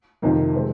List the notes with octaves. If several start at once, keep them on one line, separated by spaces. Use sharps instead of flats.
F2 C3 D#3 A#3
C3 F3 G#3 C4